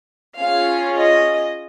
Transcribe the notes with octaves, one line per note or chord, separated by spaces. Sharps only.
C#4 F4 G#4 F5
D#5